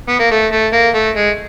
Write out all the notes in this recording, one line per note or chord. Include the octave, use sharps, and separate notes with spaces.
B3
A#3
A3
A3
A#3
A3
G#3